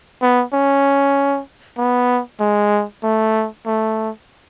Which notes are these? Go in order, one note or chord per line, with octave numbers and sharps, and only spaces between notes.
B3
C#4
B3
G#3
A3
A3